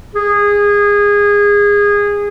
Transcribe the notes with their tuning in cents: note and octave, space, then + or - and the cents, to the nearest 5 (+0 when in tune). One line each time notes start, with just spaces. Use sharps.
G#4 -20